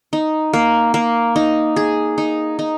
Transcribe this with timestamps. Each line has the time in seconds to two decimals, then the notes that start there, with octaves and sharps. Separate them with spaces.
0.13 D#4
0.53 A#3
0.94 A#3
1.36 D#4
1.76 G#4
2.18 D#4
2.59 D#4